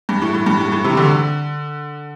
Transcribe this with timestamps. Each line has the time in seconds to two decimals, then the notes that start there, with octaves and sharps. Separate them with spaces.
0.09 G2
0.22 A2
0.34 A2
0.46 G2
0.60 A2
0.72 A2
0.84 C3
0.97 D3